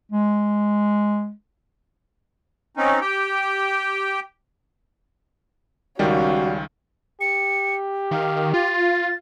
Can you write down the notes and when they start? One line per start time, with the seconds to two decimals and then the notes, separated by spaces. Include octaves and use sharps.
0.12 G#3
2.77 C4 C#4 D#4
3.01 G4 G5
5.99 C#2 D#3 G3 C#4 F#4 F5 G5
7.21 G4 C#7
8.11 D#3 F5
8.54 F4 A6